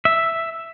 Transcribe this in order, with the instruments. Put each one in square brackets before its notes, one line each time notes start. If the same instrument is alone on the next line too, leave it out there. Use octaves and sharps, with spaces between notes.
[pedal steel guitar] E5